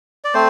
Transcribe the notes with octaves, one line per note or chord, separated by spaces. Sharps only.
D5
A3 C4 C5